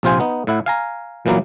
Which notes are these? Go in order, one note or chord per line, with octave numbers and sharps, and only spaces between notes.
A#1 C3 F4 C5 G#5
B3 D#4
A2 E4 F#5
F5 G#5 A#5
A#2 E3 F#3 A#3 B3